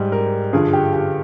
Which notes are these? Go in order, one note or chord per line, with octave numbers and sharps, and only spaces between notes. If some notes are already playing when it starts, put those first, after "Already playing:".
Already playing: G#2 G3
A#4
G2 D3 F3 G#4
G4
G4